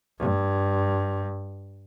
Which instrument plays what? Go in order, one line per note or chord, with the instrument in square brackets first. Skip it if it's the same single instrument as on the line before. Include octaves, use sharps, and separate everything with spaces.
[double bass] G2